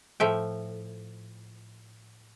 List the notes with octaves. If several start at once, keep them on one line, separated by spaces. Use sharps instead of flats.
A2 F3 E5 G5